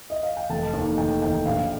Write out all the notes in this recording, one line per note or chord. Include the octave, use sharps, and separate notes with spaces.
D#5
F5
G5
F1 A5
D#2 D#3
F1 G5
D#2 D#3 G5
A#1 F5